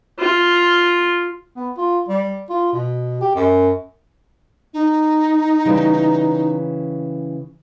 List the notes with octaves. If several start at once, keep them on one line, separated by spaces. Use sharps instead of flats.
F4
B3
F4
G3
F4
B2
G4
F#2
D#4
C#3 E3 G3